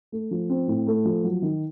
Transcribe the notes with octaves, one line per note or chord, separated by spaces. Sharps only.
A3
F3
C4
A2
A3
F3
F#3
D#3